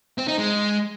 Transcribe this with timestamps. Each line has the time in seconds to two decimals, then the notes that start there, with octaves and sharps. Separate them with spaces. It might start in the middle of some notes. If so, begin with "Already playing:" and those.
0.18 C4
0.28 D#4
0.38 G#3